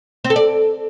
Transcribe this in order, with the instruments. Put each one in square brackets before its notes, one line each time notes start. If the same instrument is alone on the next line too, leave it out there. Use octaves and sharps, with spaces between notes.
[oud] C4
A4
D5